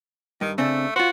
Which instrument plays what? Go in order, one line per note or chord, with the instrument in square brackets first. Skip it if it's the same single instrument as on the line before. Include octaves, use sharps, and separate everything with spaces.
[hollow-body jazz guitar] G2 [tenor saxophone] D#3
[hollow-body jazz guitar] C#3 C4 D4 [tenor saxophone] A3
[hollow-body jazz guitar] F4 C5 [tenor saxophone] F#4